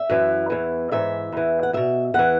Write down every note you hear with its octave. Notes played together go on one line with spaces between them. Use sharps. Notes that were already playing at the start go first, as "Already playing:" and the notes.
Already playing: E5
F#2 E3
E2 E3
G#2 E3 E5
E2 E3
F#5
E2 B2 E5
E2 E3 F#5